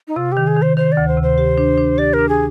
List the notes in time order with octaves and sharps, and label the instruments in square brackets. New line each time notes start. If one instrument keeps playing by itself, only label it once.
[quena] D#4
[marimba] C3 [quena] F4
[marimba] D#3 [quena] G4
[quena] G#4
[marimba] D#3
[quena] C5
[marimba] D#3 [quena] C5
[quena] D5
[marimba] D2
[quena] C5
[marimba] C3
[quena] C5
[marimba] G4
D4
D4
[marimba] G4 [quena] D5
[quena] A#4
[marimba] D4
[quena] G#4